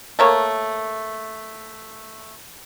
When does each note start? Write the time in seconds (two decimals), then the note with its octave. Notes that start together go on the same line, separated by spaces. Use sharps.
0.19 A3 A#3 C#5